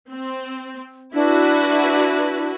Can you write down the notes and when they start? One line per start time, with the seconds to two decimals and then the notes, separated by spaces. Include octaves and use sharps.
0.10 C4
1.14 D4 E4 F#4 B4